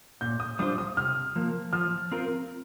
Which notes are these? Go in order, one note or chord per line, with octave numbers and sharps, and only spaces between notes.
A#2 G6
D#6
G3 D4 F4 C5 D#6
D#6
C3 F6
F3 A#3
F3 F6
C4 F4 A#4